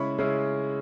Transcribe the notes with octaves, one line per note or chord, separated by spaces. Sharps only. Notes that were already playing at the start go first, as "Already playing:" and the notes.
Already playing: C#3 G#3 C#4 E4 B5 C#6
C#3 G#3 C#4 E4